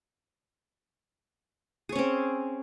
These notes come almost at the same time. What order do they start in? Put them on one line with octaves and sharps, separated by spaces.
G#4 C#5 C#4 C4